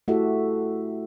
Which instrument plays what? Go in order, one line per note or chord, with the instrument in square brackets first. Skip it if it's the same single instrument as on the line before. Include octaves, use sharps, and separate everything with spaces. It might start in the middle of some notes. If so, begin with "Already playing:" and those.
[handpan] A3 E4 F#4 G4 A4 E5